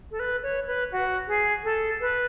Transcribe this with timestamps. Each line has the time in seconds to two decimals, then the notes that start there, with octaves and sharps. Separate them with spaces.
0.11 A4
0.20 B4
0.43 C#5
0.67 B4
0.92 F#4
1.28 G#4
1.64 A4
2.01 B4